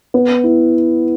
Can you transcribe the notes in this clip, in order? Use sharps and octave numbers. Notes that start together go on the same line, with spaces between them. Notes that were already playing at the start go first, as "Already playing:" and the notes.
B3
E4